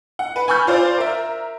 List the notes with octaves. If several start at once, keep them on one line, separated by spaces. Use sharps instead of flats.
F#5
B4
G#5 B5 C#6 E6 F6 G6
F4 C5 D5 F5
A#4 E5